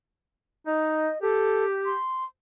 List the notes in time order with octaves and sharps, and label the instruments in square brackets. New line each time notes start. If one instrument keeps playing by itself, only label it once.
[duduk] D#4 [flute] D#5
[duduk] G4 [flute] A4
[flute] C6